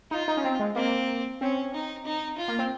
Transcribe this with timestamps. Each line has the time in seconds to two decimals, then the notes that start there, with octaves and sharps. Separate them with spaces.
0.11 D#4 F4
0.28 D#4
0.37 C#4
0.44 C4
0.60 G#3
0.76 A#3 C4
1.41 C4 C#4
1.74 D#4
2.05 D#4
2.37 F4
2.48 A#3
2.59 C4